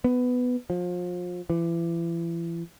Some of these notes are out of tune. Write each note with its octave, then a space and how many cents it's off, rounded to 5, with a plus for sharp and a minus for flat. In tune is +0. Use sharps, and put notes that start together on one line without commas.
B3 +10
F3 +30
E3 +35